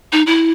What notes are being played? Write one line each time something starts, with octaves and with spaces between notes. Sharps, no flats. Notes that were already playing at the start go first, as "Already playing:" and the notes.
D#4
E4